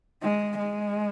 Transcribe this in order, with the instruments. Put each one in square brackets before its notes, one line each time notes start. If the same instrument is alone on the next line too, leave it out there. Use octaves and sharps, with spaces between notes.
[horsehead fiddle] G#3
G#3